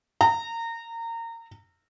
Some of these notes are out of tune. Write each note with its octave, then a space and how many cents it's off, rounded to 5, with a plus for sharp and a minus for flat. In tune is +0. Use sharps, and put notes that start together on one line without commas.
A#5 -25